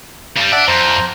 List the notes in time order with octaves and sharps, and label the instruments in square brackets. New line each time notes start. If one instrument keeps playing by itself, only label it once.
[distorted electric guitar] G2 G3
[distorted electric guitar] D4 D5 [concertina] E5 F#5 A5
[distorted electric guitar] F2 [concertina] C5 A#5